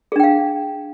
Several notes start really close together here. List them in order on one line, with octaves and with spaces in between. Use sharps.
G#4 D4 G5 F5